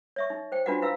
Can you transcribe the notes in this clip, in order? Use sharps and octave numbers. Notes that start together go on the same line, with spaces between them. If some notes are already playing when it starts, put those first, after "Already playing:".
C#5 E5 C#6
D#4
C5 G5
D4 F4 F#4 B4 D#5 F#5
E4 B4 F5 E6